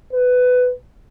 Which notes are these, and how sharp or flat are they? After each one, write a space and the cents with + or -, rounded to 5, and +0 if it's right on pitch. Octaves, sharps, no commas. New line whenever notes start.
B4 +15